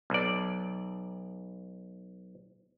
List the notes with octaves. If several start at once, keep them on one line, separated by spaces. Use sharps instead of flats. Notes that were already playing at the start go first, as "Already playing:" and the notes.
B1 D5